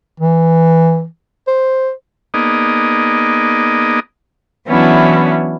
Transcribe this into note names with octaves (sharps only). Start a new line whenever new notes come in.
E3
C5
A#3 B3 D#4 G#4 D5 D#5
E3 F#3 B3 C#4 D4 E4